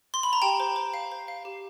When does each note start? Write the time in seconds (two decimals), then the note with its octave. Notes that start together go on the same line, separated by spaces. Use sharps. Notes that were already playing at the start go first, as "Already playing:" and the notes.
0.14 C6
0.23 B5
0.33 A#5
0.42 G4 G5 A5
0.60 C5
0.76 C5
0.94 F5
1.12 C5
1.28 F5
1.45 G4